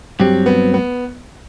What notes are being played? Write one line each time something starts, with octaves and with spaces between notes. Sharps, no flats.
G2 F#3 C4 G4
B3
B3